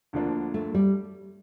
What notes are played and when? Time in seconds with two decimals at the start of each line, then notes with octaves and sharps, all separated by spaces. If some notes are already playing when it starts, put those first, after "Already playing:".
0.13 D2 D3 F3 A#3 D4
0.54 A3
0.74 G3